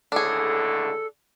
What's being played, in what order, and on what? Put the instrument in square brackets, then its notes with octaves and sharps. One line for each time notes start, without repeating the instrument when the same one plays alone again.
[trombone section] C#2 A2 D3 [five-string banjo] D4 G#4 [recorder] A4